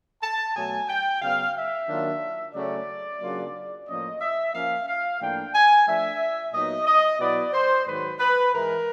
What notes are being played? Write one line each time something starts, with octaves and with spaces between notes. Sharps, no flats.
A5
B2 F#3 A3 G#5
G5
C#3 F#3 B3 F5
E5
D#3 F#3 A#3 D4 F4
C#3 F#3 A3 C#4 D5
C#3 F#3 A#3 D4 F4
A2 F3 A#3 C#4 D#5
E5
F3 A#3 C#4 F5
F5
A2 F3 A#3 D4 G5
G#5
F3 A3 D4 E5
A#2 F#3 B3 D#4 D#5
D#5
B2 F#3 B3 E4 D5
C5
G#2 D#3 F#3 B4
B4
G#2 E3 G#3 A#4